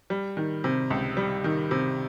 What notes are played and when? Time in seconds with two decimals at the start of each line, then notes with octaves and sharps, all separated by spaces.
0.10 G3
0.37 D#3
0.64 C3
0.90 C#2
1.17 G3
1.44 D#3
1.71 C3